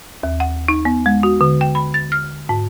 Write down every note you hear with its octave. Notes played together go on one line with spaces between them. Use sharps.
D#2
F#5
D#4
B3
G#3
F#4
D3
G5
B5
A6
F6
G#2